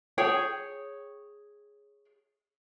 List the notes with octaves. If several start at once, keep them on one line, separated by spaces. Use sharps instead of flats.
G#4 C#5 G5